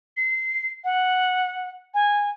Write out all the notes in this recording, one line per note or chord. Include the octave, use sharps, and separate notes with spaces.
C7
F#5
G#5